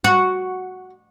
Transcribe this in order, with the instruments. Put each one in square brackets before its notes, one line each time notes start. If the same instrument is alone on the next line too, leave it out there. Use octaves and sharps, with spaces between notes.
[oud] F#4